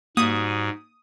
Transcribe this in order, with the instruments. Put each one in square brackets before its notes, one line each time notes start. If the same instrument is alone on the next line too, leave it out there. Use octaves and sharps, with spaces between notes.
[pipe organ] G#2 [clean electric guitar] G3 D#4 F#4 [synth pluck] A#3 [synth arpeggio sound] D#6